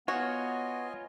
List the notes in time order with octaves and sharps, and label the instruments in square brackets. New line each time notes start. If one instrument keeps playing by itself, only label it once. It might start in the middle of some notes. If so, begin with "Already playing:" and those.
[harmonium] B3 [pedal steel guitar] F4 C#5 [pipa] F#4 [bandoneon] D#5 G#5